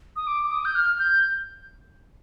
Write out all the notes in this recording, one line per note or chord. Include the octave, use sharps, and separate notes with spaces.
D#6
D6
D6
D#6
G6
F6
G6